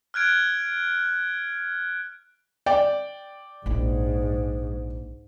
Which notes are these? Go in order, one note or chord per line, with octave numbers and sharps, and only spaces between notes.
F6 F#6 G#6 D7
D5 G5
A#1 G#2 E4